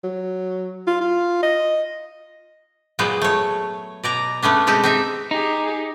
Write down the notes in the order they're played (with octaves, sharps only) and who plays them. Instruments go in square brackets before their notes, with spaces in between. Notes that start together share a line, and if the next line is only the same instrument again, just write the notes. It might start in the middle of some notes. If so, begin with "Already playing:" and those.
[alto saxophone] F#3
F4
F4
D#5
[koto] A#2 F#3 G#3 B3 C5
A3 C#5
B2 D5 A#5
A3 B3 C#4 D4
B2 G#3 C4 G4 A4
C4 D#4 E5
[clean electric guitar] D#4 [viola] G4 G#4